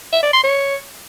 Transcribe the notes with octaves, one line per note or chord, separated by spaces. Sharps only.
E5
D5
C6
C#5